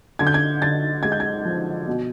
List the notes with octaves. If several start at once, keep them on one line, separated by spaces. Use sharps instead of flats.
D3 G#6
G6
G#6
D3 A6
G#3 G#6
G6
G#6
F3
B2